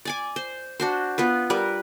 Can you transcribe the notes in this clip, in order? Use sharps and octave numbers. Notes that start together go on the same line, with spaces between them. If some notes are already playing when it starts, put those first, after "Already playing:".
D5 G#5 D6
C5
D4 F#4 C5
B3 F4 B4
G3 A#4 B4